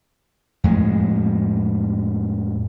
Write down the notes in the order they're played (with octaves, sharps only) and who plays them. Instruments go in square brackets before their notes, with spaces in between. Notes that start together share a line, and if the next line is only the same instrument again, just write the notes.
[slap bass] F2 A2 G#3